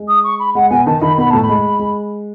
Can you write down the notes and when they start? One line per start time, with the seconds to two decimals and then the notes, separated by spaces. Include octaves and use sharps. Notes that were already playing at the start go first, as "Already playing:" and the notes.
Already playing: G#3
0.08 D#6
0.24 C#6
0.39 B5
0.55 G#3 F#5
0.70 B2 B3 G#5
0.86 D#3 D#4 A5
1.01 D#3 D#4 B5
1.18 B2 B3 B5
1.30 A2 A3 A5
1.42 B5
1.49 G#3
1.79 G#3